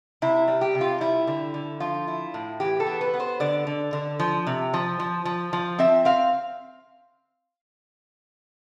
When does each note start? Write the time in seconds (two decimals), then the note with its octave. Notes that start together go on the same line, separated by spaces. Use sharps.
0.22 C3 E4
0.48 G3
0.61 G4
0.75 C3
0.81 F4
1.01 G3 E4
1.27 D3
1.54 D3
1.80 F3 F4
2.08 E4
2.34 A2
2.60 E3 G4
2.80 A4
2.86 B3
3.01 B4
3.14 B3
3.20 C5
3.40 D3 D5
3.67 D3
3.93 D3
4.20 F3
4.47 C3
4.74 F3
4.99 F3
5.25 F3
5.53 F3
5.79 C4 E5
6.05 C4 F5